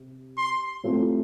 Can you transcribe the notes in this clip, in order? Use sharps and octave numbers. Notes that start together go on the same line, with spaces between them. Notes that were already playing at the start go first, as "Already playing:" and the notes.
Already playing: C3
C6
A2 G3 C4 F4 A4